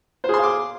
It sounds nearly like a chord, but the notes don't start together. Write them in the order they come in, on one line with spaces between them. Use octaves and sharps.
C5 G#4 C6 F5 D6